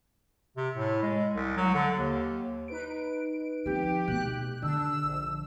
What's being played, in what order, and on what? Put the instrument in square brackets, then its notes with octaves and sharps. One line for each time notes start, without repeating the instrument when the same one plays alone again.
[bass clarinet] C3
A2
G#3
C2
F#3
D3
D#2
[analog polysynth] D#4 B4 D7
[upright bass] F3 C4 [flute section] G4
[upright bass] B2 A3 [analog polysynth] F#6
[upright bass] D3 [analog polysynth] D4 [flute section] E6
[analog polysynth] A#1